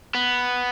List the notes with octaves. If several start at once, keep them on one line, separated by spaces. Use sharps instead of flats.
B3